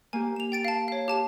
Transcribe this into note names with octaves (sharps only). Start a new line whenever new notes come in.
A#3 G4 G#5
E7 F7
G5 A6 D7
F5 A5
C#5 F5
G4 A5 E7